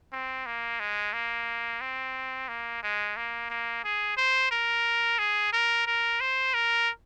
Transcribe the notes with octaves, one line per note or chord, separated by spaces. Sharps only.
C4
A#3
G#3
A#3
C4
A#3
G#3
A#3
A#3
G#4
C5
A#4
G#4
A#4
A#4
C5
A#4